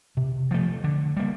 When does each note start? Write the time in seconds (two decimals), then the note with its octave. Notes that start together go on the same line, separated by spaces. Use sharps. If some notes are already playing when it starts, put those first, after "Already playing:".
0.17 C3
0.51 F3 A3
0.84 D3
1.17 G3 A#3